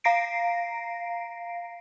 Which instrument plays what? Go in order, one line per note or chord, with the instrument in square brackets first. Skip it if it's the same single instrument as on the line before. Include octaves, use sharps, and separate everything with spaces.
[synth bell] F5 A#5 A#6 C7 D7